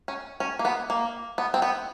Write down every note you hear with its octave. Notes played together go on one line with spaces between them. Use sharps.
C#4
C#4
A#3
B3
A#3
B3
C4
B3